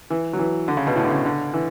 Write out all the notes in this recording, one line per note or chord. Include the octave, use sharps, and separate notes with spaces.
E3
F#3
E3
D3
C#3
B2
A2
D3
C#3
D3
E3